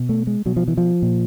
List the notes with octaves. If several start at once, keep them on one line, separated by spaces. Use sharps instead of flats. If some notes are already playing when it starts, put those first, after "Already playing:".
Already playing: B2
A3
G#3
B2 F#3
F3
E3
F3
A#2